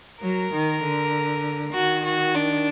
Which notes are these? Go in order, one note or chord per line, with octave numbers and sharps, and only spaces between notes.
F#3 A#4
D#3
D3
D#3 F#4
F#4
D4